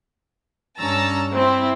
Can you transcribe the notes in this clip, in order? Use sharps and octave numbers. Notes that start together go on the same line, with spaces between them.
G2 C#4 A5 A#5 E6
C4 E4